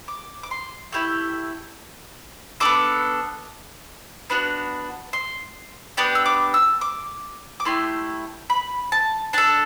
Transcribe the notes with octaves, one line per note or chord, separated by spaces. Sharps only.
D6
D6
C6
A3 E4 G4
B3 D4 A4 D6
B3 D4 F#4
C6
B3 D4 G4 D6
E6
D6
E6
D6
D6
A3 E4 G4 C6
B5
A5
D4 A4 A5